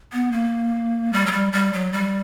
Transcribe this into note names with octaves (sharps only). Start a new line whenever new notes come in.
B3
A#3
G3
F#3
G3
G3
F#3
G3